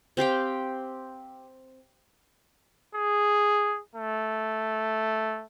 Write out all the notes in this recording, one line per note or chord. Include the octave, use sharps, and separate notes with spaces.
C4 G4 F5 G5
G#4
A3